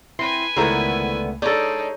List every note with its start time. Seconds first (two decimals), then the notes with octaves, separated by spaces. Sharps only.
0.19 C4 E4 B4 G#5 C6 C7
0.56 C#2 D3 D#3 A3 B3 E4 A#4 C5
1.42 G#3 D4 D#4 A4 C#5 D5 G6